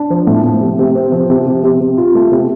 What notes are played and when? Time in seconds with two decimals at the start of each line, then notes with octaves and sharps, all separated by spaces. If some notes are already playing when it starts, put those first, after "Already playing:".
Already playing: D4
0.10 F3
0.27 A2
0.45 A2
0.61 C3
0.79 C3
0.95 C4
1.12 F3
1.30 C3
1.47 C3
1.63 C3
1.80 C3
1.98 F4
2.15 A3
2.32 C3